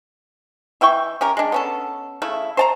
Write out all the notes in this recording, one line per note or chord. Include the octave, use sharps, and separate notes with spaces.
E3 E4 G5 C#6
C#4 G4 A#4
G#3 D4
B3 C#4 A4
C#3 A3 E4
C5 A5 A#5